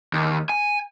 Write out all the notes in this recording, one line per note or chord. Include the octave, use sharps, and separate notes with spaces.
D#2
G#5